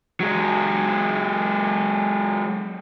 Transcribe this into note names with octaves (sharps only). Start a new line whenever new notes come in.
F#3 G#3